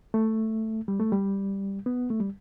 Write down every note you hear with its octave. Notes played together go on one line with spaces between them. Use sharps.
A3
G3
A3
G3
B3
A3
G3